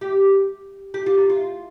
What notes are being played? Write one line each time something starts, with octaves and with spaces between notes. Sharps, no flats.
G4
G4
F4
D#4
F4